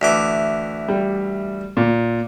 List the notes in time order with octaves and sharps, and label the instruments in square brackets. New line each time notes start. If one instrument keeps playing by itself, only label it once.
[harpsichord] D2 E3 D6
[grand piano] G3
A#2